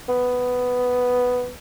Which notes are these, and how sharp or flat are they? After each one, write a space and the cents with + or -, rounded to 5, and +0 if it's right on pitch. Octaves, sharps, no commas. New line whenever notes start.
B3 +5